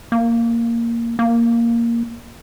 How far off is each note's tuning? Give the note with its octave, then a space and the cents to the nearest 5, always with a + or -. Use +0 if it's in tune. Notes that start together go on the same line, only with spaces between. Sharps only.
A#3 -5
A#3 +0